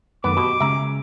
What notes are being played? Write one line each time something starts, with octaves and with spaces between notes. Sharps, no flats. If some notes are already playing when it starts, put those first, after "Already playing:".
F#2 D#3 A3 B3 D6
B2 F#4 G4
C#3 G#3 C#4 E5 A#5